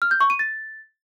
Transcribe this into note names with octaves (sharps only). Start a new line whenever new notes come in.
F6
G6
C#6
D#7
A6